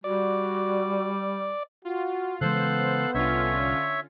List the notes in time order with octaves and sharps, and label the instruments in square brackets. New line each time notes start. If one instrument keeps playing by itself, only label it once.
[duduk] G3 [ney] F#4 [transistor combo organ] D5
[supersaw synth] F4 [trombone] F#4
[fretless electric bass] C#3 E3 G#3 [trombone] B3 [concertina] A4 F5 F#6 [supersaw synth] C5
[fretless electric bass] C2 [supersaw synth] D3 C#4 F4 [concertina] C#5 E5